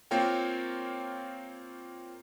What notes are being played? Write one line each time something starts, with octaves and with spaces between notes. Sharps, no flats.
A#3 C4 F4 A#4 C#5 G5